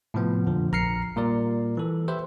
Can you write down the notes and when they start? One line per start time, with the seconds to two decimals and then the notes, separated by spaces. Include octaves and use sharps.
0.14 A2 C3 F3 B3
0.47 F2 A#2 D3 F3
0.72 A#1 A#5 F6 C7 C#7
1.16 A#2 G3 A#4 D5
1.77 E3 A4
2.08 G4 B4 C5 E5